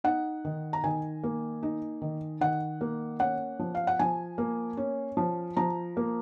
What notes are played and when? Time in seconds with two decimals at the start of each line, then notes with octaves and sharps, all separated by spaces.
0.04 D#4 F#5
0.45 D#3
0.73 A#5
0.84 D#3 G#5
1.23 A#3
1.63 D#4
2.02 D#3
2.41 D#3 F#5
2.81 A#3
3.20 C#4 F#5
3.59 F3
3.75 F5
3.87 F#5
3.99 F3 G#5
4.38 A#3
4.77 C#4
5.17 F3
5.57 F3 A#5
5.97 A#3